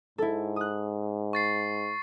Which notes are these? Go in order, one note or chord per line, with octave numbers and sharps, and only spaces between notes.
G#2 E4 A4
D#6 F#6
C#6 A6 C7